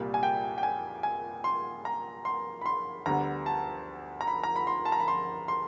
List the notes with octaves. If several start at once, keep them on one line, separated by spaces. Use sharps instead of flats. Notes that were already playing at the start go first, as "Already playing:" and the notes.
Already playing: C2 A#2 G3
G#5
G5
G5
G#5
G#5
C6
A#5
C6
B5
C6
D2 D3 G3 B3 A#5
A5
A#5
B5
A#5
B5
C6
A5
A#5
B5
C6
C6